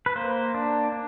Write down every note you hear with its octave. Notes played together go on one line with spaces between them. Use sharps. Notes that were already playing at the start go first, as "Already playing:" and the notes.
B4
A#3 C5
D4
D4